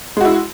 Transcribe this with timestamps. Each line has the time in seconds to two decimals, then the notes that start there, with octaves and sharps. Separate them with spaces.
0.17 G#3
0.21 F#4
0.25 E4